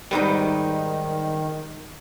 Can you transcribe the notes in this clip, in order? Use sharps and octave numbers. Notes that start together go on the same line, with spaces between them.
G#2 D#3 G3 D#4 F#4 B4